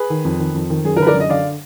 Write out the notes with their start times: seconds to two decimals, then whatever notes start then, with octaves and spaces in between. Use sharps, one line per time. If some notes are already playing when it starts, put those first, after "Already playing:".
Already playing: G#4 B4
0.10 D#3
0.25 F2
0.39 D#3
0.54 F2
0.70 D#3
0.84 F#2 G#4
0.97 A#4
0.99 D3 B4
1.07 A#4 D5
1.14 F#2
1.20 D#5
1.29 D3 D5 F5